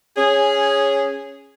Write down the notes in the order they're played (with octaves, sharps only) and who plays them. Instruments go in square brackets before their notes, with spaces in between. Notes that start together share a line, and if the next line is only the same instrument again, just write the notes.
[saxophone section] C#4 G#4